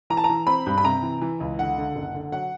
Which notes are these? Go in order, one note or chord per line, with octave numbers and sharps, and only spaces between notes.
E3 A#5
A5
A#5
E3
C4 B5
G2
B5
C3 A#5
E3
E3
C#2
D3 F#5
D3
F#1
D3
F#3 F#5